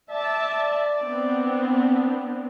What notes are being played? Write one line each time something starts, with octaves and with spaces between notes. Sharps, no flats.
D5 E5 A5
B3 C4 D4